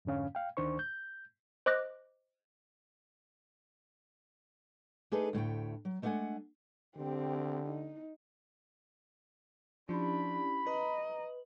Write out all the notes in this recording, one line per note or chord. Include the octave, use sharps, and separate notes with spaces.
F2 G#2 D3 C#4 F5
F5 G5
D2 D#3 D4 C5 C#6
G6
C5 D#5 D6 F#6 A#6
A3 D4 D#4 G#4 A4 B4
D2 A2 A3 G5
F#3
G#3 A3 D4 F5 F#5 G#5
D3 C4 G4
D#4
F3 C#4 D4 E4 G4 B5
B4 D#5 A#5